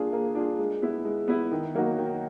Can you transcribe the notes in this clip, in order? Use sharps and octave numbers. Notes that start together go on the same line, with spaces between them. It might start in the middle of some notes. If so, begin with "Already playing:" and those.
Already playing: A#3 D4 F4 G#4
A#3
D4 F4 G#4
G#3
B3 E4
G#3
B3 E4
D#3
F#3 A#3 D#4 F#4
D#3